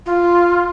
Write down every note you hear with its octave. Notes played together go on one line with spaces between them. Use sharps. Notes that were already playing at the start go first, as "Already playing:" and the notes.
F4